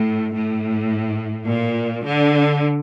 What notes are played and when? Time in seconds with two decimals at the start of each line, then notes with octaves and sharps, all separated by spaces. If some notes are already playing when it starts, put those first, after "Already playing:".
Already playing: A2
0.34 A2
1.48 A#2
2.06 D3